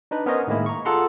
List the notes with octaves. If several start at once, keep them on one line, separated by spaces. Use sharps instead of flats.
D4 D#4 B4
B3 C#4 A#4 C5 C#5 D#5
A2 D#3 G#3 A#3 E4 G#4
A#5 C#6
F4 G#4 A4 F#5 A#5 C6